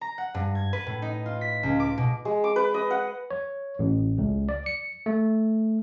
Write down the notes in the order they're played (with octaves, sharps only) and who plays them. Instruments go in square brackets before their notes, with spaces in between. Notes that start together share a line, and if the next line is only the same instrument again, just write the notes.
[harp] A#5
F#5
G2
G#6
B4
A2
D#4
F4
B6
C#2
D6
B2
[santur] G#3
D6
B4
D#5
F#5
[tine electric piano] C#5
A1
C#2
D5
C#7
A3